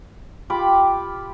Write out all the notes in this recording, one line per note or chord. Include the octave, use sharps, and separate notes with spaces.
F4 G4 B5 D6